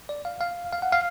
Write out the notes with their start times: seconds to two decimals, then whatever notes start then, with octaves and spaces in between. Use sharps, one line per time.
0.09 D5
0.25 F5
0.41 F5
0.72 F5
0.82 F#5
0.92 F5